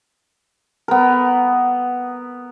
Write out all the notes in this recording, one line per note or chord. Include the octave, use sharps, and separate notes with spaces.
B3 A#4